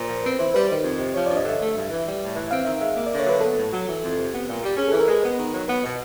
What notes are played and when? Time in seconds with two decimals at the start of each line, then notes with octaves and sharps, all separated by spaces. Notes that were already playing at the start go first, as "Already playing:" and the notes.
Already playing: A#2 C5
0.08 F3
0.24 C4 B4
0.39 E3 C5
0.54 G3 B4
0.69 D#3 C5
0.83 F2
0.99 C3
1.14 F3 C#5
1.26 G2 D5
1.37 D#5
1.44 D3 E5
1.60 A3
1.75 G2
1.90 E3
2.05 G3
2.21 A2
2.35 E3
2.51 C4 F5
2.65 D#3 E5
2.81 G#3 E5
2.95 A#3
3.07 D3 D5
3.19 C#5
3.26 F#3 B4
3.41 B3 A4
3.56 A2
3.72 F#3
3.86 E3
4.01 F2
4.17 C3
4.32 B3
4.47 A#2
4.62 G3
4.77 C#4 G#4
4.88 E3 A4
5.00 A#4
5.08 G#3 B4
5.23 B3 B4
5.37 D#3
5.52 F#3
5.67 B3 B4
5.84 B2